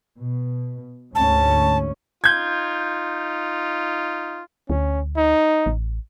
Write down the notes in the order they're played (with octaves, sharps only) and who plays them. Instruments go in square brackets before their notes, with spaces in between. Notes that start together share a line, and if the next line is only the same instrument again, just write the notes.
[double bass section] B2
[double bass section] D2 G#2 C#4 [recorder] A5
[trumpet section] D#4 F4 [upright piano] G6 G#6
[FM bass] D2 [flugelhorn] C#4
[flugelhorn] D#4
[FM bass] A1